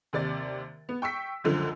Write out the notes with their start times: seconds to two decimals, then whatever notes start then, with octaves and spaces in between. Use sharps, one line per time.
0.13 D#2 C3 D5 A6
0.89 B3
1.02 G5 C#6 E6 B6
1.44 C#2 F#2 D3 F3